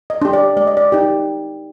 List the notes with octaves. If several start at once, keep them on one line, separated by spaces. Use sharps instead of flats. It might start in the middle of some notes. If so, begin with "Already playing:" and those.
D#5
D4 G4
D5
G#3 D5
D#5
D5
D#4 G4